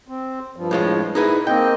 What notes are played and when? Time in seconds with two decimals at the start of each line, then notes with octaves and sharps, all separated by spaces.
0.08 C4
0.56 G2 F3
0.71 A2 G#3 F4
1.15 D#4 E4 G#4 B4
1.47 A#3 C4 D#5 G5